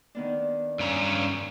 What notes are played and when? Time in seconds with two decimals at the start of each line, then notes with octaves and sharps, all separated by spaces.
0.15 D#3 B3 D4
0.79 G2 C#4 A#5